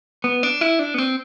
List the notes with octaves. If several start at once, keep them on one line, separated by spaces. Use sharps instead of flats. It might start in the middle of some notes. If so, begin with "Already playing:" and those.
B3
D4
E4
D4
B3
C4